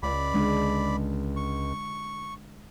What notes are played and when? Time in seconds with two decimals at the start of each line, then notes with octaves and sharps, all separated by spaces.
0.03 C#2 D5 B5
0.33 D3 G#3 D4
1.36 C#6